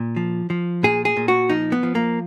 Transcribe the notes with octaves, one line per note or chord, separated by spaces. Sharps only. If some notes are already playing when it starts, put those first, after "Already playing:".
Already playing: A#2
F3
F3
A#2 G#4
G#4
A#2
F#4
F3 D#4
B3
F3
A#3